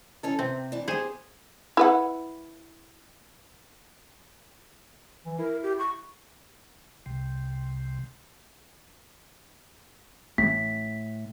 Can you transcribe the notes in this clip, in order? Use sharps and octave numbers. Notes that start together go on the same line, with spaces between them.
E3 C#4 A4
C3 C4
E3 D4
B3 G4 G#4 C5
E4 B4 F#5
E3
E4 A#4
G4
C#6
C2 C3
A1 A2 B6